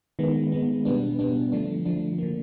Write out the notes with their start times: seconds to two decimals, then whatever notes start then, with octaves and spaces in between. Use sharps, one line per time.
0.19 D#3 G#3 B3
0.52 D#3 G#3 B3
0.85 B2 G3 B3 D4
1.19 B2 G3 B3 D4
1.52 D3 F3 A3 D4
1.85 D3 F3 A3 D4
2.18 D3 F3 A#3